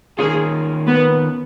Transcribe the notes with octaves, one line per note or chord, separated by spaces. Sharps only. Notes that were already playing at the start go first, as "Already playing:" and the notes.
D#3 A#3 C#4 F4 G#4
B3